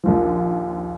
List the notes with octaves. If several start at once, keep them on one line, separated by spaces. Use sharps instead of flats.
A#1 D#2 F3